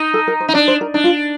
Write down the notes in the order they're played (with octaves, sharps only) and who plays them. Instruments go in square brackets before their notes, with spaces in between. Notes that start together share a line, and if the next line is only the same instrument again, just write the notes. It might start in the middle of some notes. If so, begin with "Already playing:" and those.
Already playing: [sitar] D#4
[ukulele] A4
A#4
C5
[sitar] D#4
[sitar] D4 [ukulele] D5
[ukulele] C5
A#4
[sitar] D4 [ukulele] D#4
[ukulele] F4